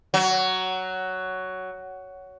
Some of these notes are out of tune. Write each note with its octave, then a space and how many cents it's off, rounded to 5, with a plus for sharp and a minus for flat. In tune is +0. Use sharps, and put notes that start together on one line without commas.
F#3 +10